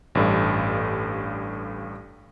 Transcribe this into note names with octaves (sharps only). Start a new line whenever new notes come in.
A1 G2 A4